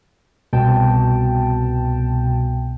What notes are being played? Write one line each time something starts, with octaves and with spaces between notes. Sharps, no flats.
C2 B2 G5 A5